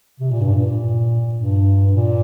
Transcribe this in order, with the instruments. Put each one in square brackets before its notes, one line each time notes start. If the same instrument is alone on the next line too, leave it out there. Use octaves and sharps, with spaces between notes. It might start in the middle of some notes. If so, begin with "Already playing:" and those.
[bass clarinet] C3
A#2
G2
A#2
G2
A#2